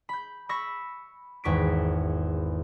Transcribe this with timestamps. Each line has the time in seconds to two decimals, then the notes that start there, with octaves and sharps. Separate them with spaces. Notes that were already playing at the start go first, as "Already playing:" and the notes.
0.09 B5 G6
0.49 B5 C#6 E6 A#6 B6
1.44 G#1 E2 C#6 B6 D7